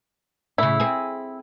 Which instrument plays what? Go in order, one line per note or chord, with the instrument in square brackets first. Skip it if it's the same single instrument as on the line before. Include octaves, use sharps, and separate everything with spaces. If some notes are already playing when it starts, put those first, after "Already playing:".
[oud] A2 C#3 [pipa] E4
[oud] C4 G#4